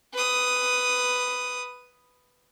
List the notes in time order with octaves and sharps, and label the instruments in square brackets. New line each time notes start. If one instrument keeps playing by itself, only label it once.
[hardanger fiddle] B4 D#6